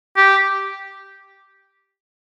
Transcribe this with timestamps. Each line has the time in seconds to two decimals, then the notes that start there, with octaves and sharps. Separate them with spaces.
0.17 G4